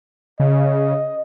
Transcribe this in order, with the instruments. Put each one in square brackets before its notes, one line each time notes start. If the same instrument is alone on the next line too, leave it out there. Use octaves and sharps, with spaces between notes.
[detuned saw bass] C#3 [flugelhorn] D#5